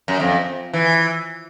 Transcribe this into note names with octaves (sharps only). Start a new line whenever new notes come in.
F#2
F2
E3